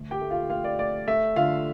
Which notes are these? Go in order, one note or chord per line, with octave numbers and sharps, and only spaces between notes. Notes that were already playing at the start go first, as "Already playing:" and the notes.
Already playing: D2
G4 G5
A3
F4 F5
A3 F4 F5
D5
A3 D5
A3 E5
D3 F4 F5